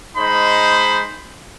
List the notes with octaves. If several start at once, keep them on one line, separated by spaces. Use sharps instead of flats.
G#3 D#4 C5 B5